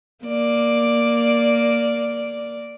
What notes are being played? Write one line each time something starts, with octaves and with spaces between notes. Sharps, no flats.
A#3 D5